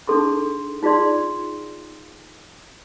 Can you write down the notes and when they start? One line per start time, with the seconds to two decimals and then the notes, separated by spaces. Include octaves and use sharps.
0.07 D4 D#4 G#4 A4 C6 C#6
0.83 D#4 F4 G#4 D5 C6